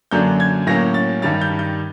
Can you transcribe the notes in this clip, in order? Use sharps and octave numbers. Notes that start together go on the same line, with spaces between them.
F#2 D3 F#3 A#3 D4 G6
G#6
A2 F#3 A#3 C#4 A#6
A6
G2 D#3 G3 A6
G6
G6